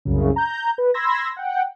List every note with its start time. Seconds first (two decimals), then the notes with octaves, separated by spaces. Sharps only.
0.05 C2 F#2 C#3
0.36 A#5 G6
0.78 B4
0.94 B5 C6 E6 G#6 A#6
1.37 F#5 G5